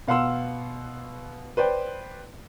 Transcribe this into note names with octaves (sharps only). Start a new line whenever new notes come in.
B2 F5 F#5 C6 E6 E7
B4 C5 D5 G5